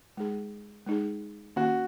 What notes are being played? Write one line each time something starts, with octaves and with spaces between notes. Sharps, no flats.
G#3 D#4 G#4
G#3 D#4 G#4
D#3 A#3 C#4 F#4